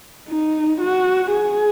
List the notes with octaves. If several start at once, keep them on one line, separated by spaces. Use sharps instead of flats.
D#4
F#4
G#4